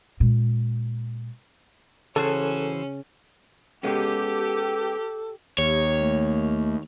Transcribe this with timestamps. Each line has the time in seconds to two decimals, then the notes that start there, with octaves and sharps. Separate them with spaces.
0.20 A#2 G#3
2.16 C#3 E3 C#4 F#4 A4 C5
3.83 G#3 B3 C#4 G4 A4
5.58 D#2 G4 C#5
6.00 A3